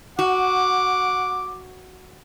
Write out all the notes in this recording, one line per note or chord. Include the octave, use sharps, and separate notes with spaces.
F#4 F#5 D6